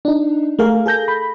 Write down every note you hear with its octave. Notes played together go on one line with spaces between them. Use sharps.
D4 D#4
A3 G#4 A#4 F5
G#4 A4 G6 A#6
B5